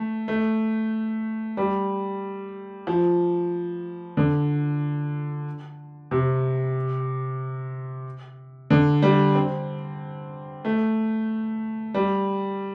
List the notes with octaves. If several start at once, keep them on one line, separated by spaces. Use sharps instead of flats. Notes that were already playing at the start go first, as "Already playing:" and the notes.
Already playing: A3
A3
G3
F3
D3
C3
D3
G3
C4
A3
G3